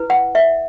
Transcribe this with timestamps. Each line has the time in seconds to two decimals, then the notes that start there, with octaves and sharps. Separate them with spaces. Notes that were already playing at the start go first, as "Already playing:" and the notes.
Already playing: E4 B4
0.10 F#5
0.35 E5